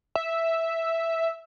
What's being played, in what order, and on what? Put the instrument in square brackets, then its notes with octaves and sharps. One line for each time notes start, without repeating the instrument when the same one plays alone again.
[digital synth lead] E5